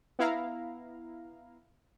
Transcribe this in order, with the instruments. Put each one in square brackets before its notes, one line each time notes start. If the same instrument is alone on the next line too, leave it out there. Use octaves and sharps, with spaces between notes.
[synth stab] B3 E4 F5 A#5